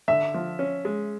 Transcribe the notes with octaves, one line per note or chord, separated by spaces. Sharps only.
D3 E5
F3
C#4
G#3